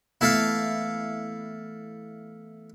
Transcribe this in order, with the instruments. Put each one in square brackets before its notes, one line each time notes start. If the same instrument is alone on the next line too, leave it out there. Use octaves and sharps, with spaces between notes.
[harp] E3 A3 B3 [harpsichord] E4 A4 F5